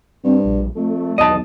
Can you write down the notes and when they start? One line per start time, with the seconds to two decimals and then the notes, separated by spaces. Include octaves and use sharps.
0.24 G2 C4
0.44 A#1
0.75 F2 A3
1.18 B1 E2 D#5 A5